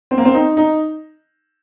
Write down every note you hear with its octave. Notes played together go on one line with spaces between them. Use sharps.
C4
A#3
C4
D#4
D#4